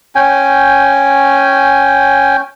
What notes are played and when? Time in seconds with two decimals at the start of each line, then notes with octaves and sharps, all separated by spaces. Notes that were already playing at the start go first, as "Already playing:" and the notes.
0.15 C#4 G5 G#5